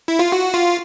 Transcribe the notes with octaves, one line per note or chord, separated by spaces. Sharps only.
E4
F4
F#4
F4